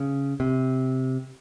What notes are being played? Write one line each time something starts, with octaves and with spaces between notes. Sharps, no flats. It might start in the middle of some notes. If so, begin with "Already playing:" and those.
Already playing: C#3
C3